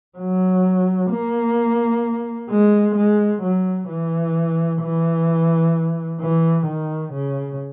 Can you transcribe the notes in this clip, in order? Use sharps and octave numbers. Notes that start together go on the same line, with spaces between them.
F#3
A#3
G#3
G#3
F#3
E3
E3
E3
D#3
C#3